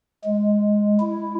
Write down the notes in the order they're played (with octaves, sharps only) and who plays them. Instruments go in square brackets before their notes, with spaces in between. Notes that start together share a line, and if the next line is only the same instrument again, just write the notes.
[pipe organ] G#3
E4